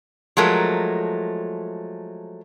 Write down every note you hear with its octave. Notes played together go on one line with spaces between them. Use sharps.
F3 F#3 G#3 A3 A#4